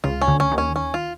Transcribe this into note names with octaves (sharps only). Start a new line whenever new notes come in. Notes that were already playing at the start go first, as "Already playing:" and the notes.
C#2 C#3 F4
C#4
D2 D3
C#4
D#2 D#3
C#4
C#4
F4